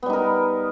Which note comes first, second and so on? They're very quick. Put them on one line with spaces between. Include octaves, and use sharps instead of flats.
B3 G3 D#4 A#4